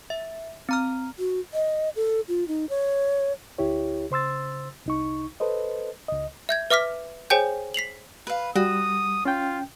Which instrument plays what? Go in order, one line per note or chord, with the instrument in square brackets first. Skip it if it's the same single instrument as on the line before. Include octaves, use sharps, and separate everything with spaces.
[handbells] E5
C4 A#5 F6
[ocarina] F#4
D#5
A4
F4
D#4
C#5
[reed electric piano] D2 E4 G4 C#5
C#3 C5 C6 E6 A6
C2 D#4 C#6
A4 B4 C5 D#5
C#2 D#5
[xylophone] E5 G6 G#6
B4 E5 D6 F6 B6
G#4 C5 C#5 G5 G#5 G6
B6 C7 F7 F#7
[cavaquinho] B4 F5
[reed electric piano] G3 [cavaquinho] F#4 [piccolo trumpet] D#6
[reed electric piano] C#4 G5 [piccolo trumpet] F4